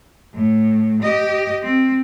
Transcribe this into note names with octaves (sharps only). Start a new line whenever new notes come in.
A2
G4 D#5
C4